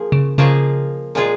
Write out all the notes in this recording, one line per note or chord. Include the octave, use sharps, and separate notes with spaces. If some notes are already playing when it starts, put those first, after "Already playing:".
Already playing: F3 A#3 G#4
C#3
C#3 F3 A#3 F4 G#4 D#5
A#2 F3 G#3 F4 G#4